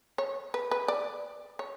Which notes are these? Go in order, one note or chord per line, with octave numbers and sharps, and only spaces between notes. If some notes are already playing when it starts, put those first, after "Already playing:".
C#5
B4
B4
D5
C#5